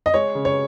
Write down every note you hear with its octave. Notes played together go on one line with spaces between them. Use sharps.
D#5
G#3 C#5
C#3
C#5